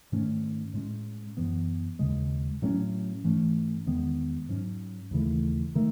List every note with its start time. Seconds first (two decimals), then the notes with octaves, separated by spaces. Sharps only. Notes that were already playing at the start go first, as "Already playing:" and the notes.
0.12 G#2 D#3 A3 C#4
0.73 A2 G#3 C#4
1.37 F#2 E3 B3
1.99 D#2 C#3 G#3
2.62 A2 F#3 A3 C#4
3.24 G#2 E3 A3 C#4
3.86 E2 D#3 G#3 B3
4.49 G#2 F#3 C#4
5.11 D#2 C#3 E3 A3
5.75 D#3 A3